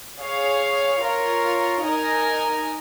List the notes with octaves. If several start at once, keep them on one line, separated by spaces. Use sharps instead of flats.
G#4 C#5 F5
F4 A#4 C#5
D#4 A#4 D#5 G#5